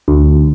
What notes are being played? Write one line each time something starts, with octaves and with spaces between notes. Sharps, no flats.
D2